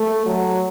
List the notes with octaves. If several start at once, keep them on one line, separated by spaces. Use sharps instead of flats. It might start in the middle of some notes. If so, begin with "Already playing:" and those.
Already playing: A3
F#3